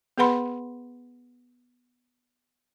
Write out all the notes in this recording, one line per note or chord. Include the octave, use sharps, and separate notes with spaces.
B3 G#4 B4 F#5 B5 C6